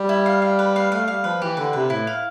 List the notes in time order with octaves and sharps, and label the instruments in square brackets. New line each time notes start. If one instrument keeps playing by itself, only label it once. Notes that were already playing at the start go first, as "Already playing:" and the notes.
Already playing: [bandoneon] G3
[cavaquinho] E4
F5
F5
B4
F5
[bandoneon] A3 [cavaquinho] F5
[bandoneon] G3 [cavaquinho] F5
[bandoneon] F3 [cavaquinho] B4
[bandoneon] E3 [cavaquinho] G4
[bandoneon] D3 [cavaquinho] B4
[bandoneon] C3 [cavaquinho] B4
[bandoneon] A2 [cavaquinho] E4
[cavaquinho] F5